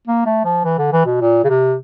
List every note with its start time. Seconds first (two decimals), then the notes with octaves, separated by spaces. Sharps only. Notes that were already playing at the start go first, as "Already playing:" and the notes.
0.07 A#3
0.26 A3
0.45 F3
0.64 E3
0.79 D3
0.93 E3
1.06 B2
1.21 A#2
1.44 C#3
1.50 C3